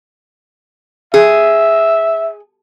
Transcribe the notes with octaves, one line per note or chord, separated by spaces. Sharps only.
G#4 E5